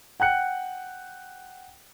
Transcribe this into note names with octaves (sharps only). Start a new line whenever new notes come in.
F#5 G5 F#6 C#7